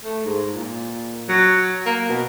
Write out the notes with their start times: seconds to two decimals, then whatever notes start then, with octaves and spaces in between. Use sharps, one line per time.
0.05 A3
0.25 G#2
0.55 A#2
1.29 F#3
1.86 A#3
2.09 B2